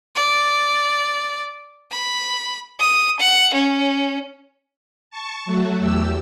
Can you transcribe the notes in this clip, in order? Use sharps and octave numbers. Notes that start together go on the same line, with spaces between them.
D5
B5
D#6
F#5
C#4
A5 C#6
F#3 A3 F#4
E2 G4 E6